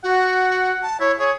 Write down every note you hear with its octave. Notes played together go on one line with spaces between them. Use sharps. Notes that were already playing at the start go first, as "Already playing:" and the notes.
F#4 F#5
A5
E4 C#5
G#4 C#5